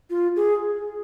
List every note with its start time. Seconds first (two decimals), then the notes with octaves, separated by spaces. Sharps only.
0.10 F4
0.36 G#4